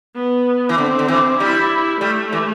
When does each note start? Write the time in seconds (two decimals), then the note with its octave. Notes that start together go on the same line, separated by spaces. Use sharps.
0.16 B3
0.69 E3
0.78 D3 C4
0.99 D3
1.08 E3
1.40 G3 E4
2.01 G3 A3
2.32 E3